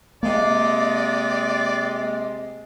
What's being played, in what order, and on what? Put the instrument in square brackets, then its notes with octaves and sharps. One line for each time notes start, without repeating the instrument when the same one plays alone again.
[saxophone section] C3 G#3 [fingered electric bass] A#3 [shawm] D5